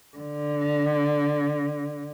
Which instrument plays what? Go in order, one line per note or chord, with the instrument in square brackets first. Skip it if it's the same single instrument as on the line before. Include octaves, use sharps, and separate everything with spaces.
[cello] D3